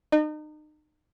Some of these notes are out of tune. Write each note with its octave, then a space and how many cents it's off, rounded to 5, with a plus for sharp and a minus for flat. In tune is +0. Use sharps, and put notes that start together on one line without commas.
D#4 -35 D#5 -35